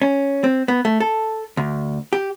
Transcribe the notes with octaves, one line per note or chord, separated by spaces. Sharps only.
C#4
C4
B3
A3
A4
D2
G4